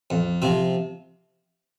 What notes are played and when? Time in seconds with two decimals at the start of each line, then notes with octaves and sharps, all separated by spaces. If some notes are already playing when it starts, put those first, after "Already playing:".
0.10 F2
0.42 C3 F3 C4